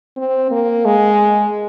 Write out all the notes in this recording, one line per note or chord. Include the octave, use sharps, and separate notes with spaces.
C4
A#3
G#3